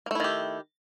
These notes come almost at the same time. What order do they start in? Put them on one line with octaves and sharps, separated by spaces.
A#3 A3 E4 D#3 G4